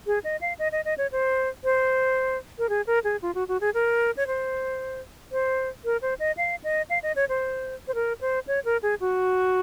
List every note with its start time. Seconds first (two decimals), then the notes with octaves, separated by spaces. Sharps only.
0.07 G#4
0.24 D#5
0.41 F5
0.59 D#5
0.72 D#5
0.85 D#5
0.98 C#5
1.12 C5
1.64 C5
2.58 A#4
2.69 G#4
2.87 A#4
3.04 G#4
3.22 F4
3.35 F#4
3.48 F#4
3.61 G#4
3.74 A#4
4.17 C#5
4.27 C5
5.32 C5
5.85 A#4
6.02 C5
6.20 D#5
6.37 F5
6.64 D#5
6.90 F5
7.03 D#5
7.16 C#5
7.29 C5
7.88 C5
7.95 A#4
8.21 C5
8.47 C#5
8.65 A#4
8.83 G#4
9.00 F#4